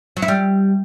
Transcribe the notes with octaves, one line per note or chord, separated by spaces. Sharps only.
F#3
E4
G3